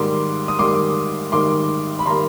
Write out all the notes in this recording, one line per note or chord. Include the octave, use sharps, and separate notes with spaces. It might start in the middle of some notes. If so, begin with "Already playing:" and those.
Already playing: G#2 D#3 G3 A#3 C6 D6
D#6
G#2 D#3 G3 A#3 C6 D6
G#2 D#3 G3 A#3 C6 D6
B5
D#3 G3 A#3 A#5 C6